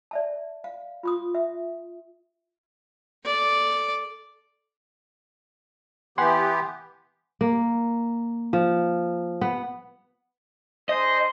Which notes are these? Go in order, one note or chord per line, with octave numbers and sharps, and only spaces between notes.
D5 E5 A5
F5
F4 C6 D#6
E5
A4 D5
E3 B3 G4 F#5 G#5 C6
A#3
F3
B3
D4 G#4 C5 D#5